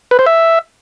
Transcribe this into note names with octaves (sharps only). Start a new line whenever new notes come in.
B4
C5
E5